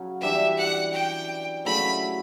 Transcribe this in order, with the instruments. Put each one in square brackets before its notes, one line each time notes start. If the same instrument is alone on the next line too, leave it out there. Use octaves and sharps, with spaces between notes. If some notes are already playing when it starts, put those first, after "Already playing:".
Already playing: [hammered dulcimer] C#3 F#3 C#4
[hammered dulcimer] E3 G3 D4 [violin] E5
[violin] F#5
G5
[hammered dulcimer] C#3 F#3 A3 E4 [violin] B5